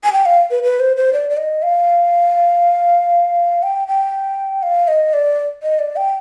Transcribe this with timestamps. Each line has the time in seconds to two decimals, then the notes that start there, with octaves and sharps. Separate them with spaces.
0.04 G#5
0.13 G5
0.25 F5
0.51 B4
0.63 B4
0.80 C5
0.97 C5
1.13 D5
1.30 D5
1.37 D#5
1.62 F5
3.63 G5
3.88 G5
4.63 F5
4.88 D#5
5.13 D5
5.63 D#5
5.79 D5
5.96 G5